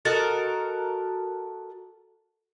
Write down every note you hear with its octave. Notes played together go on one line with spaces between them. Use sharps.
F#4 A4 A#4 D#5